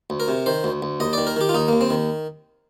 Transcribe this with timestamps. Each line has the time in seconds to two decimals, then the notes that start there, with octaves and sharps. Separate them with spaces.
0.10 D2
0.20 A#4
0.28 C3
0.46 D#3 C5
0.64 D2
0.82 D2
1.00 D#2 D#5
1.13 D#3 D5
1.27 A#4
1.36 D#3 G4
1.49 F4
1.54 D#2 D#4
1.68 D#2 A#3
1.81 C4
1.90 D#3